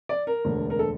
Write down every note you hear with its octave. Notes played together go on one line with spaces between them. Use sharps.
D5
A#4
E1 D2 D3
A#4
A4